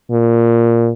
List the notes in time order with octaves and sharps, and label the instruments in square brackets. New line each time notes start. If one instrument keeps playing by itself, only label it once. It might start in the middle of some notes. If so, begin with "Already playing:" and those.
[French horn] A#2